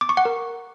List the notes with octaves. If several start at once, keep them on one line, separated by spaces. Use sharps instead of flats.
D6
C#6
F#5
A#4